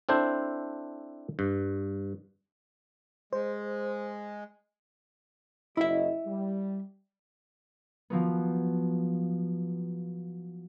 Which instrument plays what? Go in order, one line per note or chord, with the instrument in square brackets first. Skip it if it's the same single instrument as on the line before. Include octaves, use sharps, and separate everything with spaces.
[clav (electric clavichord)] C4 D4 E4 A4 C5
G2
[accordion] G#3 [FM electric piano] C5
[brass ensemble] F#1 F#3 D#5 [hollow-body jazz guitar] E4 E5
[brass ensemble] G3
[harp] F3 F#3 B3